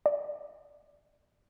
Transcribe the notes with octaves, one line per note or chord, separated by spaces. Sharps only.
D5